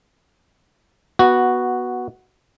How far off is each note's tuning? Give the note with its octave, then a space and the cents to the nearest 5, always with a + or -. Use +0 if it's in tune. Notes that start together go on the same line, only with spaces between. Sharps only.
B3 -10 F#4 +0